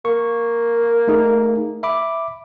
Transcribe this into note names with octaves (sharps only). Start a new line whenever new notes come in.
A#3 C#6
A3 D#4 G#4
E5 B5 D6